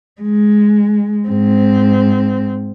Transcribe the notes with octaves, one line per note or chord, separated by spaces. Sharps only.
G#3
G#2 C4